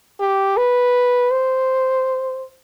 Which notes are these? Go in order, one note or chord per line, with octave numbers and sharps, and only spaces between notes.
G4
B4
C5